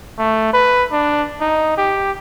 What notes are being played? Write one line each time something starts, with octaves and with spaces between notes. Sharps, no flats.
A3
B4
D4
D#4
G4